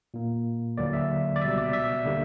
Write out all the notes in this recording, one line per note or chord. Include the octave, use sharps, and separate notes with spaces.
A#2 A#3
D2 D3 F#3 A#3 D5
E5
D5
C#2 B2 G3 E5
D5
E5
D3 G3 A#3